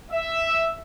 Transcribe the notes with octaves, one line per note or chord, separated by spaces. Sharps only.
E5